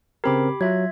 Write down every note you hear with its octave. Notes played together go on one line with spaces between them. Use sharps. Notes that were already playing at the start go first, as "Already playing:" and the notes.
C#3 C4 G4 A#4 B5 D6
F#3 F4 E5 G#6